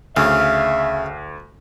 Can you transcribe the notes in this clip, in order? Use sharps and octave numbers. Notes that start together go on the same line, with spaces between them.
D2 C#3 E5 F5 E6